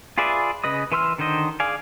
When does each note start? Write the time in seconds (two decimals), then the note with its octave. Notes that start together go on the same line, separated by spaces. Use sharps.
0.18 F4 G#4 B4 D5 E5
0.64 C#3 B4 D#5 D#6
0.92 E3 B4 C6 E6 F6
1.18 D3 D#3 D4 C5 D#5
1.60 G#4 D5 F5 G#5